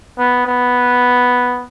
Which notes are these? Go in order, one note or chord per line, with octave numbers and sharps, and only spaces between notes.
B3
B3